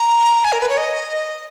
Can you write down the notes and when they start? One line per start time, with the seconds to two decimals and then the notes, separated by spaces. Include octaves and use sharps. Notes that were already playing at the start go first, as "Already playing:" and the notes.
Already playing: A#5
0.44 G#5
0.52 A#4
0.61 B4
0.69 C#5
0.77 D#5